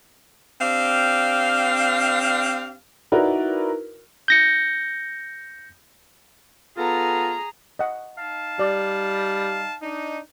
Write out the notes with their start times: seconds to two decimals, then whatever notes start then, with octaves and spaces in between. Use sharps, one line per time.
0.61 C4 D4 G4 F5
3.12 D#4 E4 F#4 A#4 B4 D5
4.28 G6 A#6 C#7
6.78 B3 F4 G#4 A4 A#5
7.79 D#5 F#5
8.18 D#4 F5 A5
8.59 G3 D5
9.83 D4 D#4